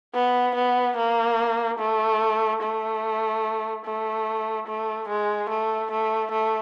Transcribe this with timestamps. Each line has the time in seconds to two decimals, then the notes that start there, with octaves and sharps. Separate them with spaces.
0.14 B3
0.55 B3
0.97 A#3
1.79 A3
2.62 A3
3.85 A3
4.67 A3
5.08 G#3
5.50 A3
5.91 A3
6.31 A3